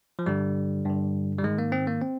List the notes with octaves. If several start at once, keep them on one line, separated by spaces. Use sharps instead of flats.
F3
G2 D3 G3
G2 D3
G3
G#2 D#3 G#3
A#3
C4
A#3
C4